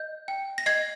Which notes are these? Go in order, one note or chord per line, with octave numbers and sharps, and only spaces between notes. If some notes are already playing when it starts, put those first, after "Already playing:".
Already playing: D#5 G6
G5
A#6
D#5 G#6 C7